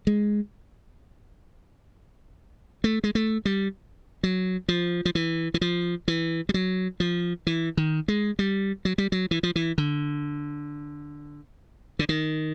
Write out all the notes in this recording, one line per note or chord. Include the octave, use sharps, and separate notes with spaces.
G#3
A3
G#3
A3
G3
F#3
F3
F3
E3
E3
F3
E3
G3
F#3
F3
E3
D#3
G#3
G3
F#3
G3
F#3
E3
F3
E3
D3
D3
D#3